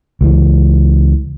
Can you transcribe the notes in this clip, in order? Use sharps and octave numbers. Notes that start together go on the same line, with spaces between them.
C#2 E3